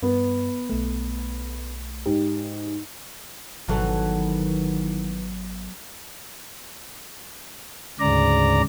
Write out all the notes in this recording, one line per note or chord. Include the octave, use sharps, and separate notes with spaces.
G2 B3
B1 A3
G#2 G4
G#1 B2 D#3 E3 F#3 B3 A4
D2 G#2 C#3 D5 A#5